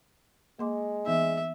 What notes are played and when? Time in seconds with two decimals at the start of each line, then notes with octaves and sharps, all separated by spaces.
0.59 G#3 A#3 C6 D6
1.06 E3 B3 D#4 E5